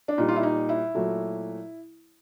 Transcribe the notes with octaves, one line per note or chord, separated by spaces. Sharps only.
D4
A#2 G3 D#4
F4
E4
D#4
E4
A#2 F#3 A3